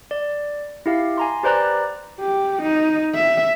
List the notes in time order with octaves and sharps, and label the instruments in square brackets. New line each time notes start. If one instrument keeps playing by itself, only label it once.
[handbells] D5
E4 G4 F5
G#5 A#5 C6
G4 B4 C5 D5 A#5 F#6
[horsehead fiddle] G4
D#4
E5